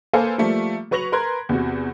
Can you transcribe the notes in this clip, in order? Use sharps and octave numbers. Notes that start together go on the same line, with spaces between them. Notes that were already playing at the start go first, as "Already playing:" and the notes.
A#3 A4 B4 C5 F5 G#5
F3 G3 A3 A#3
F#3 B4 C#6 A#6 F7 F#7
A#4 B4 C6 F#6 G#6
E2 C3 F#4